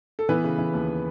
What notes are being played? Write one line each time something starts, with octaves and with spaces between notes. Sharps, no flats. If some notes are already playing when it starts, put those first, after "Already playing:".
A4
E3 B3 B4
C#3
E3
D#2